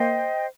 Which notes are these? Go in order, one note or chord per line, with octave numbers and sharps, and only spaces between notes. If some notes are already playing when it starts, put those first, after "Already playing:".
Already playing: A#3 C5 D#5 G5